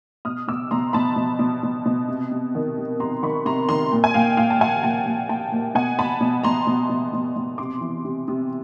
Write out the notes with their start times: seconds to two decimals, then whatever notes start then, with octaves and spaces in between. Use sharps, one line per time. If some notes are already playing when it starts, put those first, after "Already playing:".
0.25 B2 D#6 F6
0.48 B2 D6 E6
0.71 B2 A#5 C6
0.93 B2 A5 B5
1.16 B2
1.39 B2
1.63 B2
1.86 B2
2.08 C3
2.31 C3
2.55 D#3
2.78 C3
3.00 C3 A#5 C6
3.23 D#3 B5 C#6
3.46 C3 A#5 C6
3.69 D#3 A#5 C6
3.92 A#2
4.04 G#5
4.14 A#2 F5 G5
4.37 A#2 F5 G5
4.50 A5
4.60 A#2 F#5 G#5
4.83 A#2 G5 A5
5.06 A#2
5.29 A#2 G5 A5
5.52 A#2
5.75 B2 F#5 G#5
5.99 B2 A5 B5
6.21 B2
6.43 B2 A#5 C6
6.67 B2
6.90 B2
7.13 B2
7.36 B2
7.58 C3 C6 D6
7.81 E3
8.05 C3
8.28 C3